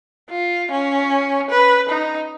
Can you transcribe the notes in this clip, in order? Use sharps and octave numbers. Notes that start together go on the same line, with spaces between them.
F4
C#4
B4
D#4